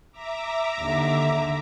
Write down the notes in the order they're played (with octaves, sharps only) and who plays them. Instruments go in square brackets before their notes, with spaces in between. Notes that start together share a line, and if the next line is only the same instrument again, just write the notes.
[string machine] E5 A#5 D6
[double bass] D#2 D3